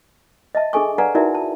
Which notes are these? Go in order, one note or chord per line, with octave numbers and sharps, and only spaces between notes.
D#5 E5 A5
D4 G#4 A4 G#5 C#6
B4 D5 F5 F#5 G#5 A#5
D#4 E4 F#4 A#4 D5 E5
A5